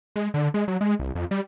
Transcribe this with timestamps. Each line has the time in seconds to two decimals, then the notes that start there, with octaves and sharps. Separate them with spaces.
0.16 G#3
0.34 D3
0.54 G#3
0.68 F#3
0.81 G#3
1.00 C2
1.15 F2
1.31 G3